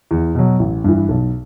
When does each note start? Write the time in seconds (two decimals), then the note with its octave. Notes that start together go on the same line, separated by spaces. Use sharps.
0.11 E2
0.35 B2 F#3
0.59 A1
0.84 G2 E3
1.09 B1